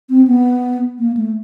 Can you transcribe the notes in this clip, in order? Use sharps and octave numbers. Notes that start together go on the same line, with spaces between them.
C4
B3
A#3
A3